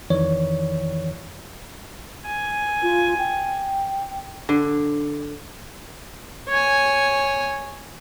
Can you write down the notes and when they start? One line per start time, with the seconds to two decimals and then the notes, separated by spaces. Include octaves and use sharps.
0.10 F2 D#3 E3 C#5 D5
2.27 G#5
2.83 F4
3.18 G5
4.49 D3
6.49 C#5 G#5